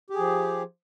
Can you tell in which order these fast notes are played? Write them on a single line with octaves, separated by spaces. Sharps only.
G4 G#4 F3